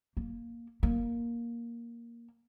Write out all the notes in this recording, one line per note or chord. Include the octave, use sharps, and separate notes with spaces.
A#3
A#3